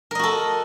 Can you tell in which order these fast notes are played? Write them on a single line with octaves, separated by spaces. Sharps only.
A#4 D#5 F#4 A4